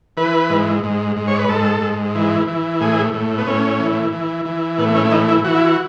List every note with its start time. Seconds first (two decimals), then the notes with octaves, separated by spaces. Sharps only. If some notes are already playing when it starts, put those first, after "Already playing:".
0.17 E3 B4
0.50 G#2
0.83 G#2
1.16 G#2
1.28 C#5
1.39 B4
1.49 G#2 A4
1.81 G#2
2.15 E3
2.47 E3
2.80 A2 G#4
3.14 A2
3.38 B3
3.47 A2 C#4
3.80 E3
4.12 E3
4.45 E3
4.78 A2 B3
4.95 C#4
5.04 E4
5.11 E3 D#4
5.28 E4
5.44 E3 F#4
5.54 E4
5.64 F#4